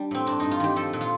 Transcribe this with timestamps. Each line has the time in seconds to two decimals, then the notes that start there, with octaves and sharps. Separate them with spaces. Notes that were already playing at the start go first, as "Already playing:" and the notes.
Already playing: G3 D4
0.11 A2 C4
0.26 G2 D4
0.40 G2 D#4
0.51 F4
0.60 D#3 G4
0.76 F3 A4
0.93 A#2
1.01 F4